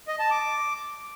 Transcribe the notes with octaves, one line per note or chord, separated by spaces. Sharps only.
D#5
A5
D6